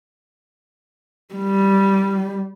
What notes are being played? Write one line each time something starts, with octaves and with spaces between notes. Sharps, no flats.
G3